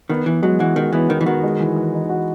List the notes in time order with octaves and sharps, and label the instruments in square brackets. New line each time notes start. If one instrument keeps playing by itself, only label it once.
[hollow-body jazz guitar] D#3 [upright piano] B3
[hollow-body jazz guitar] E3 [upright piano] B3
[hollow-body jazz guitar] F#3 [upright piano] G#3
[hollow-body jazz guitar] E3 [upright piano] F#4
[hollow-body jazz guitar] D#3 [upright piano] G#3
[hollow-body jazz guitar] E3 [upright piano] B3
[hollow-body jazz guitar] D#3 [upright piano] B3
[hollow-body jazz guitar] E3
[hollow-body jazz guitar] D#3 [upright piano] F#4
[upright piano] G#3
E3
E3
D#4
F#4